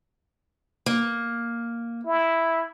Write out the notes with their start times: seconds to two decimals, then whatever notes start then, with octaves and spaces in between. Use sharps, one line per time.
0.86 A#3
2.06 E4